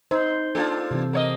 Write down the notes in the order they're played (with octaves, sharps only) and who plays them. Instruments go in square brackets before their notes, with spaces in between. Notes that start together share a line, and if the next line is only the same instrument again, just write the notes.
[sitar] D#4 [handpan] C5
[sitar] A#3 D4 F4 [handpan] A4
[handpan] C3 E3 C4
[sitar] A#3 C#5 D#5